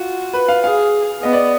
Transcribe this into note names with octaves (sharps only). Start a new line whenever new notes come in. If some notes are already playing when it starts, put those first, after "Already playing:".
Already playing: F4 F#4
B4
F5
G#4 F5
B3 D#5
D5